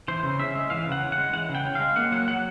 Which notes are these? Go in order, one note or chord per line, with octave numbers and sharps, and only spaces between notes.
E3 C5
C#3
C#4 E5
G#3
E3 F5
C#3
F#5
C#4
F#5
G#3
E3 F#5
C#3
G5
C#4
G#3 F5
A#3 F#5
F#3 F#5
F#3 F#5